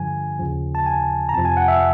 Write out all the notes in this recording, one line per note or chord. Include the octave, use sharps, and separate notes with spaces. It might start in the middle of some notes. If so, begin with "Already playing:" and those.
Already playing: G2 D3 F3 G#5
D#2 C#3 F3
A5
G#5
A#5
F2 C3 F3 A5
G#5
F#5
E5